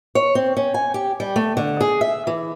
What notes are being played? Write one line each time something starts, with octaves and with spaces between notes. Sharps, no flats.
C#5
C4
C#4
G#5
G4
G3
A3
D3
G#4
E5
E3